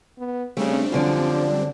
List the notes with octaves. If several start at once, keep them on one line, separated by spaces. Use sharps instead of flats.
B3
C#3 G3 A3 C4 D4
F#2 D3 F3 D5